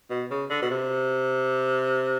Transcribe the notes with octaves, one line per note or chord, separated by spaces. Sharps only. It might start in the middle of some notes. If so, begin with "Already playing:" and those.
B2
C#3
D3
B2
C3